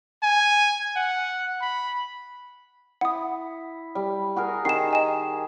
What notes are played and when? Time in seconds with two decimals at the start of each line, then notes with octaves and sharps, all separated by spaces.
0.23 G#5
0.96 F#5
1.61 B5
3.01 E4 F#5 D#6
3.95 G3
4.36 F#4 G#4 A#4
4.65 D#3 G4 G#4 C7 E7
4.91 D#5 G#5 E7